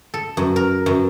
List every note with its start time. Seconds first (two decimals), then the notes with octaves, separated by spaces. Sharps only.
0.14 A4
0.37 F#2
0.56 A#4
0.86 F#2